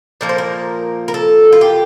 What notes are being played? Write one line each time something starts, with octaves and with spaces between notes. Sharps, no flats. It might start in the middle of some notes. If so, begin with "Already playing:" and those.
A#2 F3 A#3 A#4
C5
A#4
A#4
A4
F4
G4